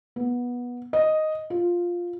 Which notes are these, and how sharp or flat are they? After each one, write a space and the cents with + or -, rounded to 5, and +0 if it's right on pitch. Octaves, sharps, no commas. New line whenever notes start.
B3 -15
D#5 +0
F4 +5